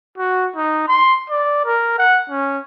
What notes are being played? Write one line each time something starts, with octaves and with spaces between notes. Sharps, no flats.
F#4
D#4
C6
D5
A#4
F#5
C#4